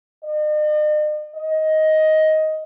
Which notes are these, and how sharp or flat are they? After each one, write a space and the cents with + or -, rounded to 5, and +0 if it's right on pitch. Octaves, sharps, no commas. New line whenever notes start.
D#5 -45
D#5 +10